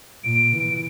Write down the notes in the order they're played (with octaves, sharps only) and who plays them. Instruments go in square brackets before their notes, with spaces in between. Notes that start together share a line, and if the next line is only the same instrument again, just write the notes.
[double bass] A#2 [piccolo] D7
[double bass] E3